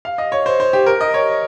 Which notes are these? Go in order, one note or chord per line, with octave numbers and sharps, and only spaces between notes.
F5
D#5
C#5
C5
C5
G4
A#4
D#5
C#5